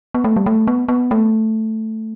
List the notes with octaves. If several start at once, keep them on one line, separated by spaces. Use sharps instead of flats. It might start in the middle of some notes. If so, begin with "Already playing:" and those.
B3
A3
G3
A3
B3
B3
A3